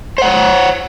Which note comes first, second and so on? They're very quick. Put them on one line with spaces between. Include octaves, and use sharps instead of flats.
C5 F#5 C#5